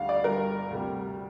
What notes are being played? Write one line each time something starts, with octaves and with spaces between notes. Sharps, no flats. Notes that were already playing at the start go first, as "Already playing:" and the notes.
Already playing: D2 D3 G3 F5
D5
G1 G2 G3 A#4
D2 C3 G3